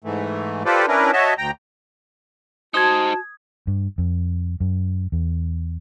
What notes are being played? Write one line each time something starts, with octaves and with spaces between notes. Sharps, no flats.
G#2 E3 A3
F4 G4 A4 B4 C5 D5
C#4 D4 E4 A#4 B4
F#4 C#5 D#5 E5 A5
D2 G5 A#5
D#4 F#4 C5 A5 D#6 G#6
G2
F2
F#2
E2